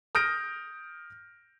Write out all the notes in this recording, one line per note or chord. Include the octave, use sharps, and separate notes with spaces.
D#6 F6 G6 A#6 D7